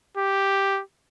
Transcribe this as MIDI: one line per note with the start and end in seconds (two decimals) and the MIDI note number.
0.17 0.81 67